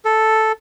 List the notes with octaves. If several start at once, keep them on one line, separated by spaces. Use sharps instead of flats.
A4